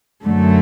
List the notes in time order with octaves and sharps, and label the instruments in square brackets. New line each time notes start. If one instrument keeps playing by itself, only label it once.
[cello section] F#2 D3 F#3 A3